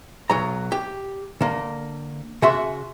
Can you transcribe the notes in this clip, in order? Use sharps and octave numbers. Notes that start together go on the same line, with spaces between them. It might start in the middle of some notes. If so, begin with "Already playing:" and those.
B1 F#3 A#5
G4
D3 A#3
C#3 F#4 E5 C6